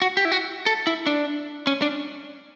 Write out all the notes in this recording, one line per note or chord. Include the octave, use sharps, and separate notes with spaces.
F#4
G4
E4
F#4
A4
E4
D4
C#4
D4